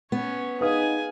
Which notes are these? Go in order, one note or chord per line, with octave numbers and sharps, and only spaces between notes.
B3 C#4 C#5
D#4 G#4 B4 F5 G#5 D#6